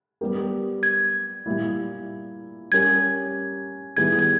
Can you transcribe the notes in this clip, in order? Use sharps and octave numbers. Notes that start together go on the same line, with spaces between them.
G3 B3 G4 A#4
G#6
A#2 G3 A#3 E4
G3 C#4 G4 A#4 G#6
D#3 G3 B3 E4 G#4 G#6
G#6